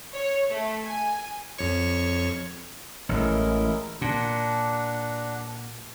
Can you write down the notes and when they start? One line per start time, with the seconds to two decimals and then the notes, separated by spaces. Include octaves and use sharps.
0.14 C#5
0.51 A3
0.83 G#5
1.58 F2 C#5 C#6
3.09 A1 G#3 E4 A#4
4.01 A#2 D4 F#5